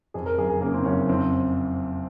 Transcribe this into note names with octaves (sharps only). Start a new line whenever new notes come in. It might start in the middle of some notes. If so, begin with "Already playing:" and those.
F2 G#4
A#4
F#1 G#4
G#4
C#3 A#3
C4
F#1 C#4
F2 C4